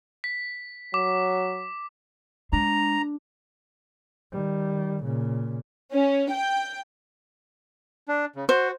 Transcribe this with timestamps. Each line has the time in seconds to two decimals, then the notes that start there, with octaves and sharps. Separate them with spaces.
0.24 B6
0.94 F#3 D6
2.52 G#3 D4 A#5
4.32 D#3 G3
5.03 A#2 C#3
5.93 C#4
6.31 G5
8.08 D4
8.36 C#3
8.49 F#4 C5